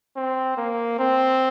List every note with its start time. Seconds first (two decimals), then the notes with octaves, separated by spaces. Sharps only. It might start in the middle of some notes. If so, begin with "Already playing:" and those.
0.16 C4
0.57 A#3
0.99 C4